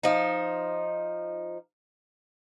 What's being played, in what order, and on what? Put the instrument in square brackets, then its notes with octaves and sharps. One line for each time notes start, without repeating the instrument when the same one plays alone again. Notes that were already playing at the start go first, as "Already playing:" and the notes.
[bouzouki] F3 D#4